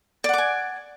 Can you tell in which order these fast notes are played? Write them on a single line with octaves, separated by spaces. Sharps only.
D5 F#5 D6 G#5